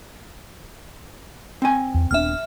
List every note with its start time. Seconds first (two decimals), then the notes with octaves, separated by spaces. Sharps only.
1.62 C4 G#5
1.94 E2
2.11 D#1 B3 D4 E5 F6